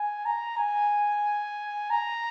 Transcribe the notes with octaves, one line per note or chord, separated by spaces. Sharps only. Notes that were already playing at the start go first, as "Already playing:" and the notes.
Already playing: G#5
A#5
G#5
A#5